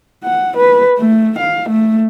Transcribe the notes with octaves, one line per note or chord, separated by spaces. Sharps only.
F#5
B4
A3
F5
A3